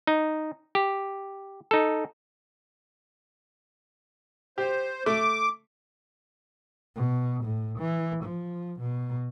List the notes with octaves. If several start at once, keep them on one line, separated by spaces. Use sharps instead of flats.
D#4
G4
D#4 A4
G4 C5
A3 D6
B2
A2
E3
F3
B2